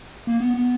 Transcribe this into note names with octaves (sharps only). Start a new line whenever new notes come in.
A#3
B3
B3